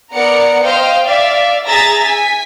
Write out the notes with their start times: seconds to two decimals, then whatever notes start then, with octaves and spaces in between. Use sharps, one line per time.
0.12 B3 A#4 D5 F#5 A#5 C#7
0.62 C5 D#5 F5 G5
1.06 D5 E5 F5
1.66 G#4 E5 A#5 A6 A#6
2.03 G#5 B6